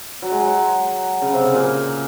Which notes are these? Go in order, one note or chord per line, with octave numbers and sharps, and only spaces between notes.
F#3
G#3
F#3
C#3
C3
C#3
A#2